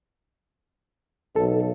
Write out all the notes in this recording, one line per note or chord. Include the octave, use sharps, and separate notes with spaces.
B1 A4